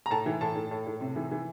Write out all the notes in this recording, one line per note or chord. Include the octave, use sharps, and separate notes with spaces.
A#5
A2 A5
E3
A2 A5
A2
A2
A2
C3
E3
E3